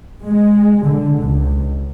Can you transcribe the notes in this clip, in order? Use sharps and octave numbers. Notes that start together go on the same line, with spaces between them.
G#3
D3
C#2